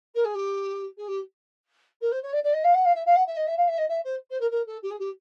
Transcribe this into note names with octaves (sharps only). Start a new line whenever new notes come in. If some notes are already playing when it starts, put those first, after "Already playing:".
A#4
G#4
G4
G#4
G4
A#4
C5
C#5
D5
D5
D#5
F5
F#5
F5
E5
F5
F#5
E5
D#5
E5
F5
E5
D#5
E5
C5
C5
A#4
A#4
A4
G4
G#4
G4